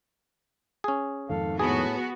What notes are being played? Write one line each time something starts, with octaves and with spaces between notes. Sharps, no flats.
C#4 G#4
F2 G#2 D#3 A4 F5
A2 B3 F#4 G#4 A5